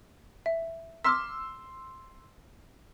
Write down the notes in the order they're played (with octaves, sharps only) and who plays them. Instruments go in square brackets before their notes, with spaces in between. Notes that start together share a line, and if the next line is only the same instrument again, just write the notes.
[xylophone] E5
[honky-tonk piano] C6 E6 [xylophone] D6 F6 B6